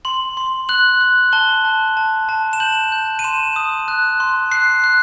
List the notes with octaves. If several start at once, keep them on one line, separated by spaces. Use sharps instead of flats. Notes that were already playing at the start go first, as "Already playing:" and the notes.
C6 F#7
C6
F#6 F#7
F#6
A5 G7
A5
A5
A5
E7
G6 F#7
G6
D#7
C6 E7
D#6
F#6
C6
F#6 C7
F#6